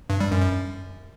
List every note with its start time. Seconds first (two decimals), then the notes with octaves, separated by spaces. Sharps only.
0.10 G2
0.20 G3
0.31 F#2
0.42 F#2